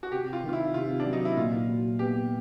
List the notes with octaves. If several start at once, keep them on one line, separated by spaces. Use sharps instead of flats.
F#4
C3 G4
F4
D#3
F4
E4
C3 F4
D4
F#3
D#4
E4
A#2 F4
F#3
B3 G4